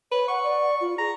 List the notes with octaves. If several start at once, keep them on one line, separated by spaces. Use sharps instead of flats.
B4 C#5
F#5 C#6
D5
F4
G#4 A#5